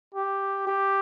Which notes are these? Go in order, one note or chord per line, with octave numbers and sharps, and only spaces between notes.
G4
G4